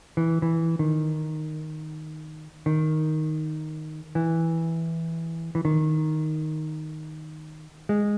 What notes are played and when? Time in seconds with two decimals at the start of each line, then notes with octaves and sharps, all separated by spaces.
0.17 E3
0.42 E3
0.79 D#3
2.66 D#3
4.15 E3
5.55 E3
5.65 D#3
7.89 G#3